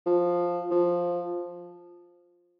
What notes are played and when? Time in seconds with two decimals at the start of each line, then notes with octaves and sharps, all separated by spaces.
0.06 F3
0.70 F3